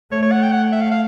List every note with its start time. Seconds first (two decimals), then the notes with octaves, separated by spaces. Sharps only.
0.12 A3 C#5
0.22 C#5
0.32 F#5
0.42 G5
0.51 F#5
0.72 E5
0.81 F5
0.92 F5